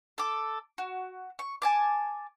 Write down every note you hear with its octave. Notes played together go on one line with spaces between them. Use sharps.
A4 D6
F#4
C#6
G#5 A5 D6